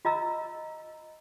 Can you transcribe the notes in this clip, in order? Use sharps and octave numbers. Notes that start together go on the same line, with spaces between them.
F4 D#5 A#5 E6